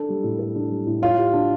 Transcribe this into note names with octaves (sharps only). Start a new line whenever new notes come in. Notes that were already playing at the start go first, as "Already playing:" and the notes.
Already playing: D4 A4
G3
A2
A4
D4
G3
A2
F4 C#5
G4
D4